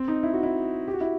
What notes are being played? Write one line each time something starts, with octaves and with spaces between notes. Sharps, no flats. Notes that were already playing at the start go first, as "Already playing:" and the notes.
Already playing: C4
D#4
E4
F#4
E4
G4
F#4
E4